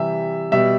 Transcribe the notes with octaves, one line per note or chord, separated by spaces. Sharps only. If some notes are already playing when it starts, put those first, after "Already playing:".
Already playing: C3 E3 G3 E5
B2 G3 E5